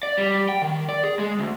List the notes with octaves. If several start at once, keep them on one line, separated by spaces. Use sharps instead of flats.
D5
G3
G5
D#3
D5
G#4
G#3
D2